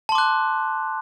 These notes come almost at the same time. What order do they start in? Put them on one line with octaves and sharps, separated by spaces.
A5 C6 D6 F#6